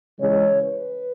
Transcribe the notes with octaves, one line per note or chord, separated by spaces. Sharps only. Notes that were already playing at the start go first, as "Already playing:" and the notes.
C#3 E3 G#3 C#5
B4